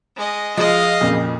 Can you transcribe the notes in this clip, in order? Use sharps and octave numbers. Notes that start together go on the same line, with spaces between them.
G#3 D#5
F3 G#3 D#5 F5
F2 A#2 C#3